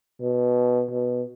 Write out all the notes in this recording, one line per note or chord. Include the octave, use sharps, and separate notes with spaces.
B2
B2